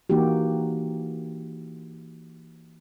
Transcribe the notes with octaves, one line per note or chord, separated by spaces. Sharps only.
E3 A#3 D#4 F#4 G4